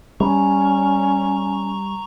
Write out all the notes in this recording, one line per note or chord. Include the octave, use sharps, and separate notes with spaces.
G3 C#4 A#5 C#6